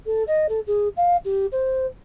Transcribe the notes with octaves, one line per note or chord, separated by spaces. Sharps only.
A4
D#5
A4
G#4
F5
G4
C5